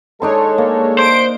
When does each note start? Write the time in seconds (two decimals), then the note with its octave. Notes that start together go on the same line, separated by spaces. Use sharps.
0.22 G#3 D4 D#4 A4 C#5 C6
0.58 A#3
0.99 C5 D7